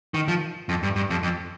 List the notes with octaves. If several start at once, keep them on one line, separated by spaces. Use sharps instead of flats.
D#3
F3
F2
G2
G2
F2
F2